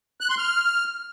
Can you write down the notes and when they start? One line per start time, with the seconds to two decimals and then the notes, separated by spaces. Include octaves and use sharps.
0.21 F#6
0.29 C6
0.38 F6